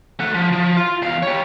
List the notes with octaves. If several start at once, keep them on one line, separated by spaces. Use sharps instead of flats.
A3 F#5
F3
F3
F4
E2 F5
G4 C#5